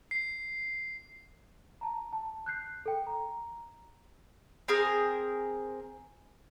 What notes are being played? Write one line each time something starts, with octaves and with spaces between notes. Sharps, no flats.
C7
A5 A#5
A5
F#6 G6 C7
A4 G5
A#5
C4 G#4 A#4